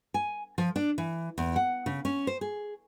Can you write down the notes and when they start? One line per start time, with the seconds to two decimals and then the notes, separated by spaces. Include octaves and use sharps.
0.14 G#5
0.58 F3
0.76 D4
0.98 E3
1.38 E2
1.56 F#5
1.86 C#3
2.05 C#4
2.27 C5
2.41 G#4